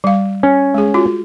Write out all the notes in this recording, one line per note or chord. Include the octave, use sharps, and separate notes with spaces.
G3 F5
C#4
G#3 G#4
F4 F#4